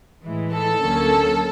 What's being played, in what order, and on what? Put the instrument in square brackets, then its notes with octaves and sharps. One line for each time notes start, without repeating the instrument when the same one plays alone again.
[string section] A2 E3 G#3
A4
D2 D3 F#3 A#3 C#4